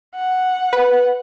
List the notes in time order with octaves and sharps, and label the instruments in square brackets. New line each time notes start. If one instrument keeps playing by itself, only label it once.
[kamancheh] F#5
[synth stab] B4